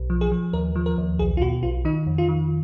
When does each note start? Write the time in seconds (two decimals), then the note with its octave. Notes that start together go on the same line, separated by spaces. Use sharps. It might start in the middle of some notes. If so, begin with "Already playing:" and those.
Already playing: B1
0.10 F3
0.21 G#4
0.32 F3
0.53 D#2 A#4
0.76 F3
0.86 A#4
0.98 D#2
1.19 B1 G#4
1.37 F4
1.42 B2 F#4
1.63 B1 F4
1.85 D#3 D#4
2.07 F2
2.18 F4
2.28 D#3